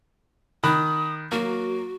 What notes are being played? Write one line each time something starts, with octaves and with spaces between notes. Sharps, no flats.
D#3 B5 D#6 F#6
F#3 A#3 F#4